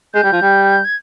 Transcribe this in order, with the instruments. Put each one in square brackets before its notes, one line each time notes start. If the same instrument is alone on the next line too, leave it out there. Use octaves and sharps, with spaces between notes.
[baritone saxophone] G#3 [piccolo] G6
[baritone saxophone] G3
F3
G3
[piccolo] G#6